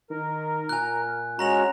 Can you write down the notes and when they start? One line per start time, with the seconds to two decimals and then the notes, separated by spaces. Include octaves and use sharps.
0.10 D#3 A#4
0.69 A#2 G#5 F#6
1.39 G#3 C#4 F#4 A#5 A#6 F7